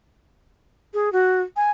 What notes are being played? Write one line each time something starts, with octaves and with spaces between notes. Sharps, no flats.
G#4
F#4
G#5